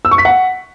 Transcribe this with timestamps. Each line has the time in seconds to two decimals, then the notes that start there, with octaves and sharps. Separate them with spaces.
0.05 E6
0.11 C#6
0.18 B6
0.25 F#5